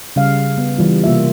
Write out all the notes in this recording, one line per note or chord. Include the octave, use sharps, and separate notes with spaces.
C#3 G3 F5
B3
E3 G3 F4
C3 A#3 F4 E5